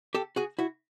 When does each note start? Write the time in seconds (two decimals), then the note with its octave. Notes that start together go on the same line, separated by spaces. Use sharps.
0.15 G4 A4
0.36 F#4 G#4
0.59 E4 F#4